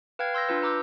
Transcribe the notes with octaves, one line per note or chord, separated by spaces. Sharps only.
B4 F5 G5 F6 G#6
C6 E6 G6 A#6
D4 F4 B4
B4 A#5 D6 E6 G6